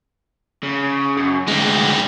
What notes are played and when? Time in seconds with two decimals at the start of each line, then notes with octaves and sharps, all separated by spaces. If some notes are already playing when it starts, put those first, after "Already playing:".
0.63 C#3
1.17 F#2
1.48 D2 G3 G#3 D#4